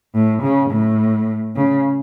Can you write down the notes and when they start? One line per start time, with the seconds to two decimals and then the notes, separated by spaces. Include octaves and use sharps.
0.15 A2
0.43 C#3
0.71 A2
1.56 C#3